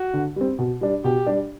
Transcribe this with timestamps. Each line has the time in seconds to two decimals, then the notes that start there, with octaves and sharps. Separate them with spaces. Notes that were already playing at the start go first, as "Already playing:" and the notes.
Already playing: F#4
0.14 D3
0.36 G3 C4
0.59 B2
0.81 G3 D4
1.04 B2 G4
1.27 G3 D4